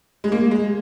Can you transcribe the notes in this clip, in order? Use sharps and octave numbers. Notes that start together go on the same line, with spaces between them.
G#3
A#3
G#3